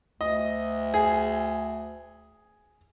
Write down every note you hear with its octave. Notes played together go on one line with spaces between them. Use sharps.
D2 D#5
G#4